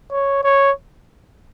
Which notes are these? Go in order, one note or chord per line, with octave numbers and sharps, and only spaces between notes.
C#5
C#5